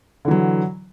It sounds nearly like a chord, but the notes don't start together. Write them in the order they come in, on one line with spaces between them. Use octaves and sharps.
D3 E3 F#3